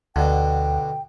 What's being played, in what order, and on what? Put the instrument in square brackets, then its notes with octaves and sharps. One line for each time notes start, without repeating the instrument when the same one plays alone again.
[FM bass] D2 [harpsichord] B2 D3 [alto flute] G5